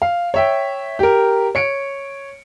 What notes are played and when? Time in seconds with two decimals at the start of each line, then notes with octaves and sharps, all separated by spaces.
0.02 F5
0.34 C#5 E5 G5
0.99 G4 A#4
1.55 C#5 C#7 D7